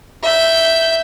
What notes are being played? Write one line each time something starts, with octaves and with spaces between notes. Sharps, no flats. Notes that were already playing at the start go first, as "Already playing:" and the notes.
E5 G6